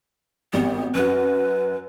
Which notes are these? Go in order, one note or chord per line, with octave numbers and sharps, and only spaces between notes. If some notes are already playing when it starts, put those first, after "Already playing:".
G#1 G3 B3
F#2 F#4 B4